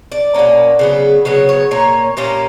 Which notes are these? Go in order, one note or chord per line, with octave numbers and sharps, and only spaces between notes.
D5
B2 A#3 C#4
C#3 F#3 B3
C#3 F#3 B3 C#5
C#5
A#2 A#3 C#4 C#5
A#2 A#3 C#4 G4